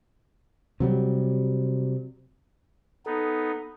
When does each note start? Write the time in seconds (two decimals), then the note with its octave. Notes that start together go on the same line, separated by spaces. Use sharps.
0.80 C3 F#3 G3
3.06 B3 D#4 A4